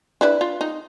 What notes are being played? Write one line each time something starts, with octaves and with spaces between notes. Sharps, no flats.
D4 E4 B4
F4
D#4